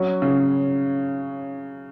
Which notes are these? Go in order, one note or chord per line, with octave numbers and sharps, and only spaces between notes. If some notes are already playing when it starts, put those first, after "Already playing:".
Already playing: F#3 C#4 F#4
C#3